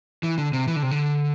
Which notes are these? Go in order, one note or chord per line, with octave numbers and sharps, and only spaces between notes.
E3
D3
C3
E3
D3
C3
D3